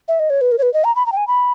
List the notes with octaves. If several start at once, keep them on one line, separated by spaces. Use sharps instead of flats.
E5
D#5
C#5
B4
A#4
C#5
B4
D#5
A#5
B5
A#5
G5
G#5
B5